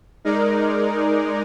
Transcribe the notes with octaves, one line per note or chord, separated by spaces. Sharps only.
G#3 D#4 A#4 D5